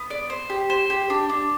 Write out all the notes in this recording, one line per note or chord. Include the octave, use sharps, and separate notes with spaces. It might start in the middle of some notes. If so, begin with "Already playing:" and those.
Already playing: B3
D5
C5
G4
C5
G4
D4
D4